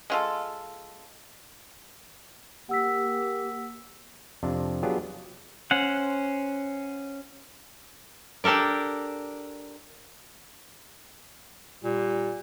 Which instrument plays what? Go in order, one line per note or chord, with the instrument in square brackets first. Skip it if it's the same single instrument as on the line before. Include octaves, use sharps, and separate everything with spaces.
[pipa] G#3 F4 A4
[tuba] A#3 [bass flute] G4 [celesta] F#5 E6 B6
[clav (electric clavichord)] F2 C3 D4
F#3 B3 D4 F4 G4 G#4
[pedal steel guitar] C#4 C5 F#5
[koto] D4 G4 A4 A#4 D5
[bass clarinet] A#2 [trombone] G3